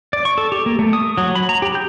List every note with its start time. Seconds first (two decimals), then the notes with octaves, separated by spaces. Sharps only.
0.13 D5
0.25 C#6
0.38 A4
0.52 G4
0.66 A#3
0.79 A3
0.93 D#6
1.17 F#3
1.36 B5
1.49 A#5
1.62 G4
1.75 G6